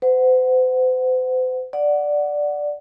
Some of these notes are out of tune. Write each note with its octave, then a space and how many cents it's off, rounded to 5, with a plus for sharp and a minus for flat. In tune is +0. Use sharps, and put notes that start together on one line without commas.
C5 -40 F#5 +0
D5 +0 F#5 +0